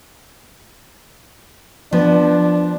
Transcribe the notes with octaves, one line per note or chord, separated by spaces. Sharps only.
F3 B3 D4